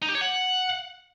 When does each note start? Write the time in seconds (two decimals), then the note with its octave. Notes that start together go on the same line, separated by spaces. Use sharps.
0.02 D#4
0.08 G4
0.15 C#5
0.21 F#5